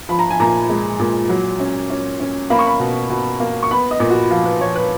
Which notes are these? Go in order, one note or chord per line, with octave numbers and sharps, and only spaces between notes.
F3 B5
A#5
G#5
A#2 A#5
G#3
A#2
F#3
C#4
C#4
C#4
A#3 B5
C#6
B5
B2
B2
A#3
C#6
B3 B5
D#5
A#2
F#4
F3 F4
B4
F3 C#5
B4